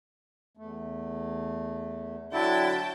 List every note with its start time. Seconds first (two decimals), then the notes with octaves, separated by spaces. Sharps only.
0.57 E2 A3
2.32 D3 F#3 E4 F#4 G5 A5